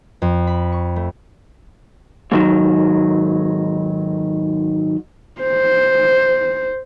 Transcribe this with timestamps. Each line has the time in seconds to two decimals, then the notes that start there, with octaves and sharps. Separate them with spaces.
0.22 F2
0.47 B5
0.72 C#6
0.96 A3
2.32 G#2 D#3 F#3
5.41 C5